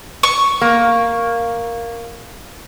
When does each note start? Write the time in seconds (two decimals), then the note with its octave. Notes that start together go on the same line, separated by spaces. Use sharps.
0.23 C#6
0.61 A#3